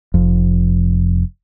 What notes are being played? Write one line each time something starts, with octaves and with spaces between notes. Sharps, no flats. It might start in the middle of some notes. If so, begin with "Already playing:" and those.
F1 F2